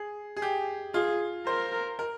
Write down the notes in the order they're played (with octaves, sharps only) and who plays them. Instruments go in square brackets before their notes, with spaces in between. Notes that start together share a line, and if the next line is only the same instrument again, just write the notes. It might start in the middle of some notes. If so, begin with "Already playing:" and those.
Already playing: [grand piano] G#4
G#4
G4
[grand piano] F4 [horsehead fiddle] G#4
[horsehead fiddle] A#4 [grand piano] C5
[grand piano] A#4